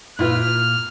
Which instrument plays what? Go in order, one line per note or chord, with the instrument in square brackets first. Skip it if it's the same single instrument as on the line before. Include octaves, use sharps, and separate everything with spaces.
[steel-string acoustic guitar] A#2 [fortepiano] E4 F4 B4 [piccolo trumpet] F6